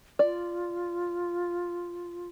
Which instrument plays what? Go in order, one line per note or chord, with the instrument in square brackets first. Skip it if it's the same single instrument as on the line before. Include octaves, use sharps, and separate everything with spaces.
[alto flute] F4 [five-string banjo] D5